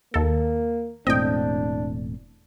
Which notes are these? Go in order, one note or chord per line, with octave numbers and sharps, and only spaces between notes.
D#2 A#3 A4
E1 A2 C4 D4 D#5 G5